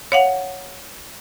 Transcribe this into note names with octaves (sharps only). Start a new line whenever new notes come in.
C#5 F5 F#5